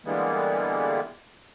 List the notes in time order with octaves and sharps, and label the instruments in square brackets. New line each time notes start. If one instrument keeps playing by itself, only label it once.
[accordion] D3 E3 G3 G#3 A#3 B3